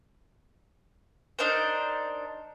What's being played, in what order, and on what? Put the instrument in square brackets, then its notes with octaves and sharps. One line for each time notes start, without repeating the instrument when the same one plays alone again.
[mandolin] D4 D#4 A#4 C5